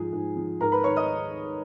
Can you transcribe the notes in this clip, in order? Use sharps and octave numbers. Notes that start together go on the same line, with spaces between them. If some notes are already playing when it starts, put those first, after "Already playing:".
Already playing: G#2 F3 G#4 G#5
G#2
F3
G#2 A#4 A#5
B4 B5
D#3 C#5 C#6
D#5 D#6